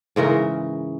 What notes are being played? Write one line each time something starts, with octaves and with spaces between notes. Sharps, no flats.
G#2 C#3 E3 A#4